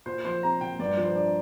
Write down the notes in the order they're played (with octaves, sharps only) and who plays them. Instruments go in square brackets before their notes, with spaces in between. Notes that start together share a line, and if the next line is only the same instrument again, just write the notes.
[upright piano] A#2 [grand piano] C5
[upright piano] F3 [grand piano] C5
[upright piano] C4 [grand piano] A#5
[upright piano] A#2 [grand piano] G5
[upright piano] G2 [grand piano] D5
[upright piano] F3
[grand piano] C5
[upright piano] D4